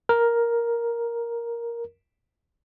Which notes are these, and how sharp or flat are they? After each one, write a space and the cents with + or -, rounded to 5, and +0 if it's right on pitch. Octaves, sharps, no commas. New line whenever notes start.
A#4 +5